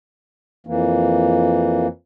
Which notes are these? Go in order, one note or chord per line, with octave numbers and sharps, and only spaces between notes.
F2 E3 A#3